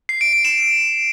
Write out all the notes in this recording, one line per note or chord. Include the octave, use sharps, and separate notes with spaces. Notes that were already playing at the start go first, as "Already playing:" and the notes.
C7
D7
D7
E7